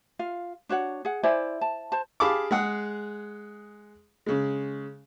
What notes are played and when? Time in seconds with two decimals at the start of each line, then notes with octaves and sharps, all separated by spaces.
0.19 F4 F5
0.69 D4 F#4 C#5 F#5
1.05 G#4 F#5
1.23 E4 C5 D5 G#5
1.61 A5
1.92 C5 A5
2.20 G4 G#4 F5 A5 B5 D6
2.51 G#3 G#4 F#5
4.26 C#3 G#3